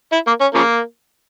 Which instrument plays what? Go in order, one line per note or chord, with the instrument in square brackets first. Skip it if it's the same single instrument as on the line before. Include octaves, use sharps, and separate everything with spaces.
[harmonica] E4
A#3
C#4
C#3 F3 A#3